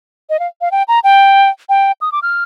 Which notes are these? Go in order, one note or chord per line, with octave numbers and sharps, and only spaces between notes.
D#5
F5
F5
G5
A#5
G5
G5
D#6
D6
F6